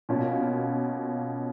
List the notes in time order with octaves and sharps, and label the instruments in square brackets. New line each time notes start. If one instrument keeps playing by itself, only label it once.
[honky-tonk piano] B2 A#3 C#4 F4